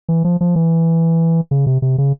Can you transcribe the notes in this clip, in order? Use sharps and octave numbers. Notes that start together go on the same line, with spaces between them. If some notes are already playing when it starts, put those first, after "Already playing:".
E3
F3
F3
E3
C#3
C3
C3
C#3